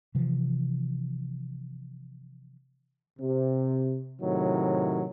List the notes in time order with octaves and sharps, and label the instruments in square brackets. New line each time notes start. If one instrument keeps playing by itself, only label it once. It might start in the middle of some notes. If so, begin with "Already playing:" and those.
[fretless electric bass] C3 E3 F3
[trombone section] C3
A2 C3 D#3 F#3